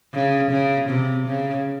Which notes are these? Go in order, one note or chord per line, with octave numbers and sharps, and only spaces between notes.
C#3
C#3
C3
C#3